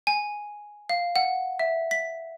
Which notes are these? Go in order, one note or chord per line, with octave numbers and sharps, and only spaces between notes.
G#5
F5
F#5
E5
B6